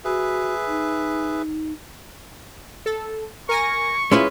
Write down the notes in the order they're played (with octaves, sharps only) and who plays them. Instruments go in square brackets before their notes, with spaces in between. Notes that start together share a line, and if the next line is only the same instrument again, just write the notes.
[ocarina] F#4 [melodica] G#4 B4 E5
[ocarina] D#4
[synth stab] A4
[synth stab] A#4 G#5 A#6 [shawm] C#6
[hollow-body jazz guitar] G#3 C#4 B4 [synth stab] E4 F4